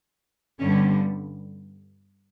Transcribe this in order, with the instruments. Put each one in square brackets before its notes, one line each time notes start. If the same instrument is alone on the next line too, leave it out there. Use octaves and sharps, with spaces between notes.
[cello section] G2 D3 G3 B3 C#4